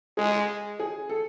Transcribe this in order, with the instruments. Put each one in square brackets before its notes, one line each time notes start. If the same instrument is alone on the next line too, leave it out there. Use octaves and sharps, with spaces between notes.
[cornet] G#3 [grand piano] G#4
[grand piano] G#4
A4